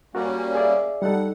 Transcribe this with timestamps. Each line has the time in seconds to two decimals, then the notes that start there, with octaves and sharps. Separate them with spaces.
0.15 G3 A#3 C#4 F#4 A#4 D5
0.55 G#4 D5 E5
1.02 G3 D#4 A4 F#5